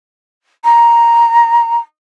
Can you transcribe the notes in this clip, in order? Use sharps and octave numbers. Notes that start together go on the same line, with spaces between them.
A#5